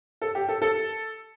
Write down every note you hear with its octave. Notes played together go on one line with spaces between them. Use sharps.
A4
G4
A4
A4